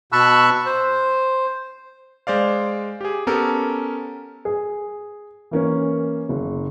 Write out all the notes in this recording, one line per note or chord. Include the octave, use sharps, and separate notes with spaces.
B2 A5 B5 C#6 E6 F#6
C5
G#3 C5 D5 F5
G4 G#4
B3 C#4 G4 A4 A#4
G#4
E3 A#3 C#4
F#1